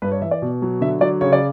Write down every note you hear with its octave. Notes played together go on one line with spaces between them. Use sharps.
G2 B4
C#5
E3 E5
D5
B2
F#3
D3 E5
F#3 D5
C#3 C#5
D5